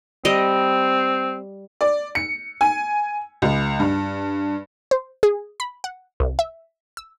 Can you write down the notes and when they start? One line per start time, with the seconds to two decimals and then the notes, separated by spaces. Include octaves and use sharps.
0.25 G3 C4 D#5
1.81 D5
2.15 C#7
2.61 G#5
3.42 C#2
3.80 G2
4.91 C5
5.23 G#4
5.60 B5
5.84 F#5
6.20 C2
6.39 E5
6.97 E6